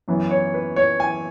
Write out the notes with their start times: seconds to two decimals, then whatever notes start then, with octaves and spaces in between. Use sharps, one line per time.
0.08 F#2 E3 B3
0.31 C#5
0.54 B4
0.76 C#5
1.00 G#5